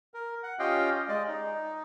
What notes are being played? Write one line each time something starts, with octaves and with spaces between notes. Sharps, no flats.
A#4
F#5
C#4 F4 G4 D#5 F5 G5
G#3 D5 D#5
D#4